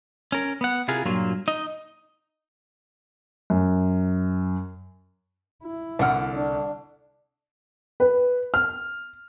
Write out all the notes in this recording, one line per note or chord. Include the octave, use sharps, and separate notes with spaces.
C#4 A#4
B3 F#5
C3 E4 F4 G#4 A#4
G2 A#2 F#3 A#3 F4
D#4 D#5
F#2
E4
C2 D3 F#5 F6
D4
B4
F6